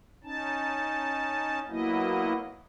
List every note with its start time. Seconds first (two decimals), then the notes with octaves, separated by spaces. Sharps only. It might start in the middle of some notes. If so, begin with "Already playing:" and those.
0.24 C#4 D#4 A5
1.69 F#3 A#3 B3 E4 D#5